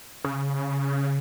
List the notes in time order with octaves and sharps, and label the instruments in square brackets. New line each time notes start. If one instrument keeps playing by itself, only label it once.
[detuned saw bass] C#3